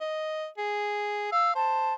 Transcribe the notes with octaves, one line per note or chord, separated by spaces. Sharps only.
D#5
G#4
F5 E6
C5 A5